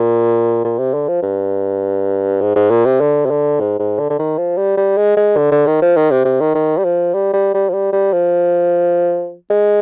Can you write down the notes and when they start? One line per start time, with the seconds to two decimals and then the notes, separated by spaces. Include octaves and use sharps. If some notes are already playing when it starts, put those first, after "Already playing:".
Already playing: A#2
0.64 A#2
0.78 C3
0.94 D3
1.08 F3
1.22 G2
2.41 G#2
2.56 G#2
2.70 A#2
2.86 C3
3.00 D3
3.25 C3
3.30 D3
3.60 G#2
3.79 G#2
3.99 D3
4.10 D3
4.19 D#3
4.38 F3
4.57 G3
4.77 G3
4.97 G#3
5.17 G#3
5.37 D3
5.51 D3
5.67 D#3
5.82 F3
5.96 D#3
6.11 C3
6.25 C3
6.40 D#3
6.55 D#3
6.78 G3
6.84 F3
7.14 G3
7.33 G3
7.54 G3
7.69 F3
7.73 G3
7.92 G3
8.13 F3
9.50 G#3